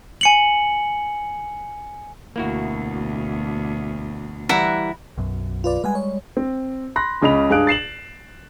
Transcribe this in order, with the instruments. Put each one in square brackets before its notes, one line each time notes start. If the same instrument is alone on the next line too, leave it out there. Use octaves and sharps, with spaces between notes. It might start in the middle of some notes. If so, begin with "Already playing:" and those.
[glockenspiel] G#5 C#7 F#7
[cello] D2 B2 [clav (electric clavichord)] A#3 E4 F#4
[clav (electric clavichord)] E3 G3 [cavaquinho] E4 F#5 A#5
[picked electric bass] B1 F#2
[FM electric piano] F4 B4 D5
[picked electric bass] G3 G#3 [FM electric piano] B4 F#5 G#5
[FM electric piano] C#5
[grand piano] C4
B5 C6 F#6 A#6
C#2 C#3 D#5 B5 F7
G2 G#4 F5 F#6 D7
A6 C7 E7 F#7